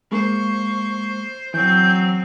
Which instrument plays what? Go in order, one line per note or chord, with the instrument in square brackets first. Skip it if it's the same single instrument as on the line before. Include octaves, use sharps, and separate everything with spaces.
[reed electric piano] G#3 A#3 [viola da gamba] C5 [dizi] C#6
[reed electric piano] E3 [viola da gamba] F#3 C4 [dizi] G6